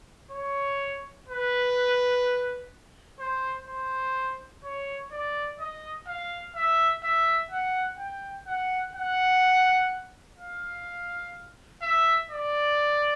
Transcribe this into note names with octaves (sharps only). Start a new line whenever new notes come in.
C#5
B4
C5
C5
C#5
D5
D#5
F5
E5
E5
F#5
G5
F#5
F#5
F5
E5
D5